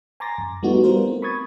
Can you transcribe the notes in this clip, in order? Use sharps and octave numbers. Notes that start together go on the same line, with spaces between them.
G#5 A#5 C6 D6 A6 A#6
F#2
G3 A3 B3 D#4 E4 F#4
G3 B3 F4 A#4 C5
A3 C4
B5 C#6 D#6 G#6 A6